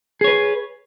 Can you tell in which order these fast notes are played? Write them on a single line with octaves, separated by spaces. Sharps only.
G#4 C#5 B4